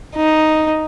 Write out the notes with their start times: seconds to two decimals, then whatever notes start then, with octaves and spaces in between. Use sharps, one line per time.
0.16 D#4